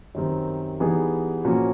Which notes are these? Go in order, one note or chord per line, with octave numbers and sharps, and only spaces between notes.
F#2 D#3 G3 C4
E3 G3 B3 D#4 G#4
A#2 F3 A#3 C#4 F#4